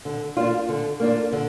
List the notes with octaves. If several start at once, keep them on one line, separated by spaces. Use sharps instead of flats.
D3
A#3 D4 F4
D3
A#3 D4 F4
D3